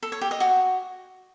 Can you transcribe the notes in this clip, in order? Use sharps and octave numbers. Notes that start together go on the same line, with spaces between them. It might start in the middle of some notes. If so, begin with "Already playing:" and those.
A4
C#5
G4
D#5
F#4